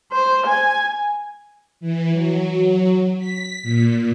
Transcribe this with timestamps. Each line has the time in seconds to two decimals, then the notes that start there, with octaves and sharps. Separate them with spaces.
0.12 C5
0.46 G#5
1.81 E3
2.13 F#3
3.18 B6
3.63 A#2